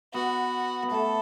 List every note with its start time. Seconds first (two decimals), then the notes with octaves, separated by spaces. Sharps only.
0.14 B3 F#4
0.83 B3
0.91 A3 A4